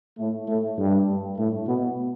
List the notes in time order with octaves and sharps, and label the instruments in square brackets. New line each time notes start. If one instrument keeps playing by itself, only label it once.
[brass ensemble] A2 A3
A2 A3
G2 G3
A2 A3
B2 B3